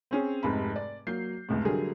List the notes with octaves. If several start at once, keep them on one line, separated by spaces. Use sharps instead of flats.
C4 C#4 G#4
F1 G#2 C3 B5
D5
F#3 A#3 G6 C7
F1 C#2 A2
D3 F#3 G3 A3 G#4 A#4